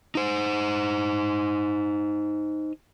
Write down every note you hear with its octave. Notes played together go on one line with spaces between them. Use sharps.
D#4 C5